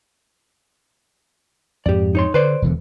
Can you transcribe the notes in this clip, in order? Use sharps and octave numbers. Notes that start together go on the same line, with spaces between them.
F2 G#2 G4 D5
D#4 C#5 C6
D3 B4 C5 D5
E1 E2 D3